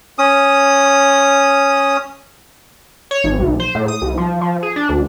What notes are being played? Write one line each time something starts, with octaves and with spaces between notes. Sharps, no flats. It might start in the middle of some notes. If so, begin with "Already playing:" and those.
C#4 D#6
C#5
G#1
B1
C5
A2
D#6
C2
F3
F3
G#4
D4
D2